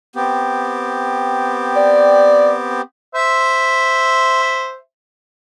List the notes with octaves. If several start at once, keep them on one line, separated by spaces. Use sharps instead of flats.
B3 C4 G4
D5
C5 E5